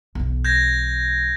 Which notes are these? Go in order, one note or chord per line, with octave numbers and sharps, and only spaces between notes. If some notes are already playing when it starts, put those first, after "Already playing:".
B1 E3
G6 G#6 A#6